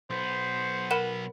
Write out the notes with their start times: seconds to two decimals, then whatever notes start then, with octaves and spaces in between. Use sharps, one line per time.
0.10 B1 B3 C5
0.91 A#4 F#5 B5 D#7 E7